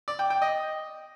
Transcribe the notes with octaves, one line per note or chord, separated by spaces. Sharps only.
D5
G5
G5
D#5